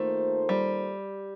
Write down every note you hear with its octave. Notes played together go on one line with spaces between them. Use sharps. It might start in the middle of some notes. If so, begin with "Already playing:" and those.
Already playing: D#3 A3 A#3 F4 A4 C5
G3